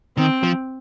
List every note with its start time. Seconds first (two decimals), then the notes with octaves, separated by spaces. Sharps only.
0.17 D#3 C4
0.43 F3